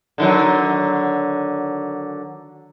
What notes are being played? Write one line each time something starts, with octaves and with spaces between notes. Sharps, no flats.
D3 D#3 F#3